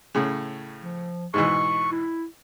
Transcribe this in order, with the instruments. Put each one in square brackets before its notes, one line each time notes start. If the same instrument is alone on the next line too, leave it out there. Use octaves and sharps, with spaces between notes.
[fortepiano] A2 C#3
[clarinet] F3
[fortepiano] G#2 B2 E3 [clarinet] C#6
[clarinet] E4